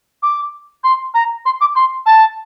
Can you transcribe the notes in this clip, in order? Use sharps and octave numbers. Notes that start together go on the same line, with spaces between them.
D6
C6
A#5
C6
D6
C6
A5